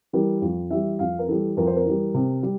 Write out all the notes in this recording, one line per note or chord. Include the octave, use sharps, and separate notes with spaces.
E3 G3 A#4
F2
E3 G3 E5
F2 F5
A#4
E3 G3 A4
F2 A#4
C5
A#4
E3 G3
C3
G3